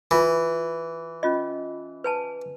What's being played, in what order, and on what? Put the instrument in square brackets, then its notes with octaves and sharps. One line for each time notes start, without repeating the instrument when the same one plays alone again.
[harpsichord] E3 [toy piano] F4
[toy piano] C#4 F4 D#5
B4 G#5 A5